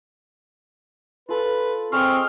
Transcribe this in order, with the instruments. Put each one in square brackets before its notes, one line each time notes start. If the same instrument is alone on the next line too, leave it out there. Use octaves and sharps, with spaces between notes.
[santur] F4 A4 [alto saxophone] B4
[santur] G#3 D#5 [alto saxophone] C4 [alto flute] C#6 [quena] F6